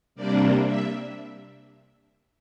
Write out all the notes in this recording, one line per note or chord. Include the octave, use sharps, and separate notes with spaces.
C3 G3 A#3 D4 D5
E5